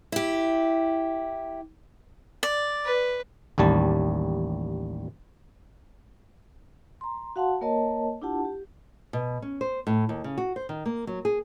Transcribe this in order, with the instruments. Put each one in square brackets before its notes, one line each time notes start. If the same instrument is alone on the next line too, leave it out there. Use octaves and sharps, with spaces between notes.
[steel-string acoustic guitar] E4 G4
[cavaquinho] D5
[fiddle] B4
[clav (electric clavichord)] A1 D#2 G3 A5
[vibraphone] A#5 C6
F#4 F5 F#5 A5 C6
A#3 A#4 C#5 D#5 A5
D4 E4 F4 G4 F#5 A5
G4
[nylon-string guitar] B2
C#4
C5
A2
D#2
C#3
F#4
C5
D#3
A#3
F#3
G#4